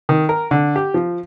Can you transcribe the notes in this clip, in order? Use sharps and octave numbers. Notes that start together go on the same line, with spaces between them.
D#3
A#4
D3
G4
F3